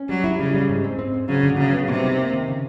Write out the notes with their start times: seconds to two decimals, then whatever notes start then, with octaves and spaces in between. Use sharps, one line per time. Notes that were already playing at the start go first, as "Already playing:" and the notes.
Already playing: C#4
0.09 F#3 G3
0.24 E4
0.39 C#3 G3
0.55 G3
0.69 G#2
0.84 C4
0.99 C4
1.14 G#2
1.28 C#3 F#3
1.43 D3
1.58 C#3 F#3
1.73 B3
1.88 C3 G3
2.04 D#4
2.18 A#3
2.34 D#3
2.48 C#3